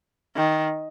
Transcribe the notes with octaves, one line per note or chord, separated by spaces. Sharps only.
D#3